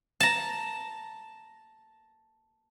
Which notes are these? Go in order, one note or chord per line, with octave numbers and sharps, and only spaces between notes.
A5 A#5